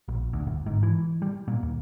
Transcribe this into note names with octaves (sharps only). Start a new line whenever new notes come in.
A#1
D2
G1
G#2
E3
G3
A#2
D#2